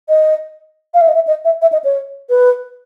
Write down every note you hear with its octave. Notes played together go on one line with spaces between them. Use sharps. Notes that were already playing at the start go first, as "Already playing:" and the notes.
D#5
F5
E5
D#5
E5
D#5
E5
E5
D#5
C#5
B4